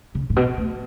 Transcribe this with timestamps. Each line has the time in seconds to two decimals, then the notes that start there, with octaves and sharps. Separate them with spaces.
0.15 C#3
0.30 A2
0.36 B2
0.57 A3